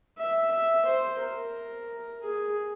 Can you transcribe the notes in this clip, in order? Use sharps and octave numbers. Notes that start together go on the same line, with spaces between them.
E5
E5
C5
A#4
G#4